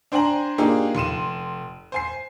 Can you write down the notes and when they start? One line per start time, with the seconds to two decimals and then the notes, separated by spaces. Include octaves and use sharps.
0.12 D4 C5 G5 G#5 A#5 F#7
0.58 A#3 D4 D#4 F4 G4 G#4
0.95 F1 C6 D#7 E7
1.92 C5 G#5 C7